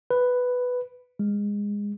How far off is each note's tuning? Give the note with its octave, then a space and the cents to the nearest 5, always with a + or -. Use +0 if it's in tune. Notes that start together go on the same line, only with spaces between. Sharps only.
B4 +5
G#3 -20